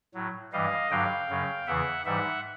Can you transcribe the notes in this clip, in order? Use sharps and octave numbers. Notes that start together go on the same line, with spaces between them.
A2 F#3
G2 E3 G3 D#5 F5
G2 D3 F#3 F5 G5
F#2 C#3 F#3
E2 C#3 E3 E5 F#5
G#2 E3 G3 E5 F#5